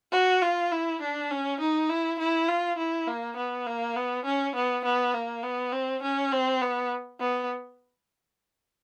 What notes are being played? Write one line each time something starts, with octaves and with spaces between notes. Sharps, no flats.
F#4
F4
E4
D4
C#4
D#4
E4
E4
F4
E4
A#3
B3
A#3
B3
C#4
B3
B3
A#3
B3
C4
C#4
C4
B3
B3